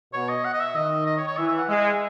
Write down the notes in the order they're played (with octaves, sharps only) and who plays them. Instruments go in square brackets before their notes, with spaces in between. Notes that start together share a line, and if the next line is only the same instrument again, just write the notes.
[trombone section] B2 [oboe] C#5
[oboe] D#5
F#5
D#5
E5
[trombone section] D#3 [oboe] D#5
[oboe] D#5
C#5
C#5
[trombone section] E3 [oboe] E5
[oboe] E5
F#5
[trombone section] G#3 [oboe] E5